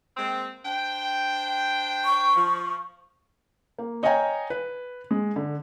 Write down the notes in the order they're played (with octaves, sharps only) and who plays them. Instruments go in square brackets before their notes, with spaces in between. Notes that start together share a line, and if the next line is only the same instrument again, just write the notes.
[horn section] G#3 A#3 C4
D4 C5 G5
[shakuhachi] C#6
[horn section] F3
[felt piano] A#3
C#5 D#5 F5 G5 G#5 A#5
B4
G#3
D3